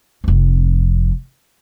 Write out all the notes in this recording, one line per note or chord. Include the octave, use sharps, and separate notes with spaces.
F1 F2